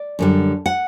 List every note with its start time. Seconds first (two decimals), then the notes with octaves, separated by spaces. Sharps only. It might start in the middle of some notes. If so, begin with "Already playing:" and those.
Already playing: D5
0.19 F#2 D3 G3
0.66 F#5